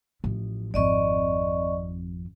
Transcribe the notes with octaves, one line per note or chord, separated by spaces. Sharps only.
A1 F3
G#1 F2 D5 D#5 C#6